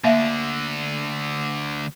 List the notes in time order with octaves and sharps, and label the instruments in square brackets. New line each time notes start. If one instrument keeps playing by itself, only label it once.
[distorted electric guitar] D2 D3 [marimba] A#3 E5 F5